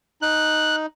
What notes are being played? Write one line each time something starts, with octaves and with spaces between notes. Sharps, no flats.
D#4 F#6